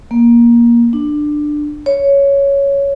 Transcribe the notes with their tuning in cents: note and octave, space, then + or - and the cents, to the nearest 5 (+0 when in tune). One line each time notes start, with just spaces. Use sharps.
A#3 +15
D4 +15
C#5 +5